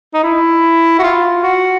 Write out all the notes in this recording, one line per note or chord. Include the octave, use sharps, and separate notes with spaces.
D#4
E4
F#4
F4
F#4